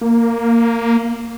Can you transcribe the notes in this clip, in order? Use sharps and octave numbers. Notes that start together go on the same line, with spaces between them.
A#3